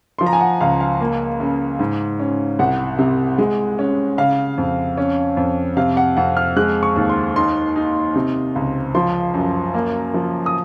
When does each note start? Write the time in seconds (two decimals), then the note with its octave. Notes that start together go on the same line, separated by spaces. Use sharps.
0.19 F3 C6
0.26 A#5
0.33 G#5
0.41 F#5
0.61 C#2 F5
0.81 F5
1.00 A#3
1.40 C#3
1.79 G#2
2.20 C#4
2.59 C2 F#5
2.99 C3
3.38 G#3
3.79 C#4
4.18 C#3 F5
4.58 F2
4.97 C#4
5.37 F2
5.77 C3 F5
5.97 F#5
6.17 F2 F#5
6.37 F6
6.56 G#3 F#6
6.83 C#6
6.96 D#2
7.09 C6
7.36 D#4 C6
7.76 D#4
8.16 C3
8.55 C#2
8.95 F3 C6
9.34 F#2
9.74 A#3
10.14 F3
10.46 D#6